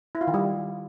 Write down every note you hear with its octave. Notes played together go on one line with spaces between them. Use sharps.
E4
F4
D#3
G3